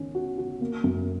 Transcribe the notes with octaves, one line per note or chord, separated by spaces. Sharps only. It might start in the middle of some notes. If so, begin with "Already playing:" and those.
Already playing: D#3 C#4
F#4
F#4
A#3
F#2